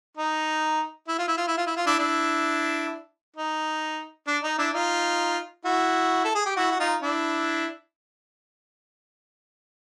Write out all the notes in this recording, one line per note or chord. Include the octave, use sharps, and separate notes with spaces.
D#4
E4
F4
E4
F4
E4
F4
E4
F4
D4 E4
D4 E4
D#4
D4
D#4
D4 E4
D#4 F4
E4 F#4
A4
G#4
G4
E4 F#4
F#4
D#4 F4
D4 E4